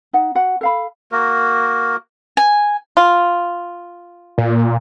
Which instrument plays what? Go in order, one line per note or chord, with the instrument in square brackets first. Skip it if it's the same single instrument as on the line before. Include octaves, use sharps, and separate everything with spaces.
[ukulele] D#4 F#5
F#4 F#5
A4 F5 B5
[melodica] A#3 F#4 A#4
[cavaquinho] G#5
[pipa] F4
[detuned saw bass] A#2